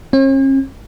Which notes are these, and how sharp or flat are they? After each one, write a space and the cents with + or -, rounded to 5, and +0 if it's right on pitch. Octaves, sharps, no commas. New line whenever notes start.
C#4 -45